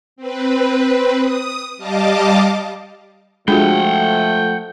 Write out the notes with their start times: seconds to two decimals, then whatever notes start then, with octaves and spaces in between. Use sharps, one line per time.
0.16 C4 B4
1.19 D#6
1.77 G3 D#5 F5 A5 D6
3.48 F3 G#3 A3 D4 F4 F#4 F#5 G5